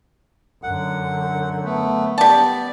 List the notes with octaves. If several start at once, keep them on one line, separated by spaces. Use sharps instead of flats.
F#2 D3 F#5
A3 B3
G3 B3 D5 A5